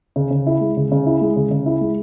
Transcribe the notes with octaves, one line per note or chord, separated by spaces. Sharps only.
C#3
C#3
E4
G#3
C#3
C#3
E4
G#3
C#3
C#3
E4
G#3